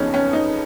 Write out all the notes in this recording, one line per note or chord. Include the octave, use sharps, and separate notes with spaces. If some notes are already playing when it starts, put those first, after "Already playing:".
Already playing: F2 C#3 F3 B3 C#4 D#4
C#4
D#4